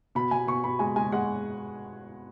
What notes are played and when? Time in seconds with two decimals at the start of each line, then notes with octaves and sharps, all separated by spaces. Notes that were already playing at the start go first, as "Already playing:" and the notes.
0.15 B2 B5
0.31 B2 G#5
0.47 B2 C#6
0.64 B2 B5
0.79 G#3 G#5
0.96 G#3 G#5
1.12 G#3 F#5